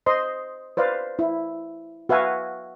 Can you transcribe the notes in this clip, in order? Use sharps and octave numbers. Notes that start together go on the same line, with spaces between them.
C5 D#5 C6
B4 C5 D5 F5
E4
F#4 B4 E5 F5 G#5